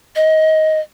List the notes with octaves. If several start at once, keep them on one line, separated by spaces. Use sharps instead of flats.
D#5